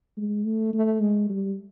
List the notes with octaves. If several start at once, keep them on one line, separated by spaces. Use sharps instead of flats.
G#3
A3
A3
G#3
G3